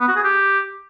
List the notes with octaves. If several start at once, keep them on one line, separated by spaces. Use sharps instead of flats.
B3
F#4
G#4
G4